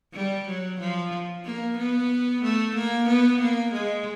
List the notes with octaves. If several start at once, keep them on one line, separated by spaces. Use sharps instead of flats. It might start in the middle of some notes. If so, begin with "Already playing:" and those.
G3
F#3
F3
A#3
B3
A3
A#3
B3
A#3
G#3